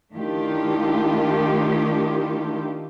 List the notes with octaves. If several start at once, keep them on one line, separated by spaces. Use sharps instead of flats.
D#3 A3 D4 E4 F4 G4